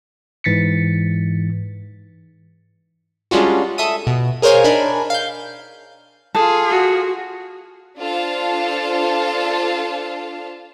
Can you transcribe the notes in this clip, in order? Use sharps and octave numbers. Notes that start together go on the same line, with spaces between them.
G#2 E3 A6 B6 C#7
G3 G#3 C#4 D4 F4 F#4
A4 E5 D#6 D#7
B2
G#4 A#4 C5 C#5 F5 G#5
D4 D#4 A#4 G#5 B5
F5 G6
F4 G#4 A4
F#4
D4 F4 A4 C5 F5 A5